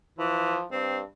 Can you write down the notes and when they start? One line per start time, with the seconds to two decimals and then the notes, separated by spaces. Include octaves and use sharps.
0.19 E3 F3
0.71 G2 C4